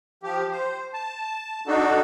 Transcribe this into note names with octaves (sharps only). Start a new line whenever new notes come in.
F3 G4
C5
A5
D4 D#4 F#4 A4